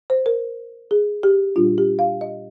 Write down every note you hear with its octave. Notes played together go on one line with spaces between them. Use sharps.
C5
A#4
G#4
G4
A#2 G3 D4 F4
G4
F5
D#5